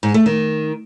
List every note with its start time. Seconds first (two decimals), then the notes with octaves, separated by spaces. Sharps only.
0.03 G#2
0.14 A3
0.26 D#3